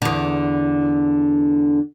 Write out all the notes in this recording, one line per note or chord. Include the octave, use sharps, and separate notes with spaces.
E2 D3